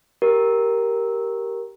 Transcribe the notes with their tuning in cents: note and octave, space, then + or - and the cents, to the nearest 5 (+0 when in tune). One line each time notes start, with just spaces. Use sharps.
G4 -10 A#4 +0